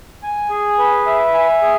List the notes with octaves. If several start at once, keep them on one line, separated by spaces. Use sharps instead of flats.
G#5
G#4
B4
E5
G#5
G#4